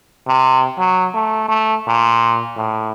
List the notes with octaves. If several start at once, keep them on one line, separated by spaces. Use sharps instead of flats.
C3
F#3
A3
A3
A#2
A2